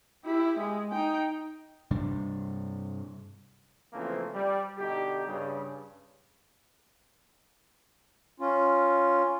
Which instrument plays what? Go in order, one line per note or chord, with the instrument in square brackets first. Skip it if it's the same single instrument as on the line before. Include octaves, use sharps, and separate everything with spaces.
[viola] E4 G4
G#3
D#4 G5
[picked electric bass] G2 C3 G3 D4
[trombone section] C#3 E3 F3 A3 A#3 C4
G3
B2 D3 D#4 G4
G2 C#3 G3
[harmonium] C#4 F4